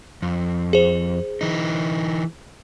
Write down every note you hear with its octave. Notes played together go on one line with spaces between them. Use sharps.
F2
G#4 C5
E3 D#4